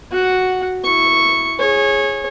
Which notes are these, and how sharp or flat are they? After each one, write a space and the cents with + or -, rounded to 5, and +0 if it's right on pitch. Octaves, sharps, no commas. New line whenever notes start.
F#4 +0 F#5 +0
E4 +0 C#6 -5
G#4 +0 C#5 -20